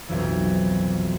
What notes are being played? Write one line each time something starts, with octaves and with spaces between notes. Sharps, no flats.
B1 F2 E3